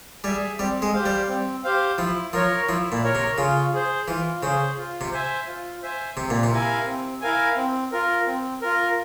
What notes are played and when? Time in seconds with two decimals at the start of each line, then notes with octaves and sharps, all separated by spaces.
0.24 G3 G#4 E5 G#5
0.59 G3 C4
0.82 G#3
0.93 G4 C5 F5
1.06 G3
1.28 C4
1.64 G4 C5 F5
1.98 F3 E4
2.33 F3 A#4 C#5
2.69 F3 E4
2.92 A#2
3.04 A#4 C#5
3.15 C3
3.38 C#3 F4
3.73 G#4 C5
4.08 E3 F4
4.42 C#3 G#4 C5
4.77 F4
5.01 C3
5.12 C5 E5 G#5
5.47 F4
5.83 C5 E5 G#5
6.17 C3 C4
6.30 A#2
6.44 C3
6.51 E4 A#4 F5 G#5
6.86 C4
7.21 E4 A#4 F5 G#5
7.56 C4
7.92 F4 A#4
8.26 C4
8.62 F4 A#4